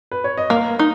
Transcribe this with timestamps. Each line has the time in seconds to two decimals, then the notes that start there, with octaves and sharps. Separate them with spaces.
0.12 B4
0.24 C#5
0.38 D#5
0.50 A#3 F5
0.79 D#4